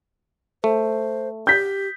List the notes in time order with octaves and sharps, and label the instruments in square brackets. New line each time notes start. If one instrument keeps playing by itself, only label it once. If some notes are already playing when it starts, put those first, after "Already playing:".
[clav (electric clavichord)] A3 [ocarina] C5
[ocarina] G4 [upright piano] G6 B6